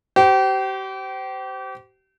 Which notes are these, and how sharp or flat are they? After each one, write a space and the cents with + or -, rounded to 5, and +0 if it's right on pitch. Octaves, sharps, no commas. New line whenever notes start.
G4 -35 C5 -20